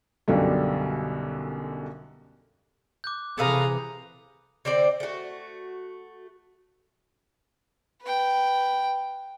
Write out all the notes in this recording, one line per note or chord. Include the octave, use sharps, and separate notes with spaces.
B1 F#2 B2 D3 G3
D6 F#6 G6
C3 E3 G#4 A4 B4 F5 A#5
D3 C4 C5 D5
A3 F#4
B4 G5